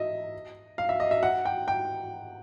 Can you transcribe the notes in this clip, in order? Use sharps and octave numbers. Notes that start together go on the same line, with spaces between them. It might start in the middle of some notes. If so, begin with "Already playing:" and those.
Already playing: D#5 E5
F5
E5
D#5
E5
F#5
G5
G5